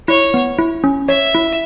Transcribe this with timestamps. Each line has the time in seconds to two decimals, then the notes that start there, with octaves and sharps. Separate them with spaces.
0.08 E4 C#5
0.34 B3
0.59 E4
0.84 C#4
1.09 C#5 E5
1.35 E4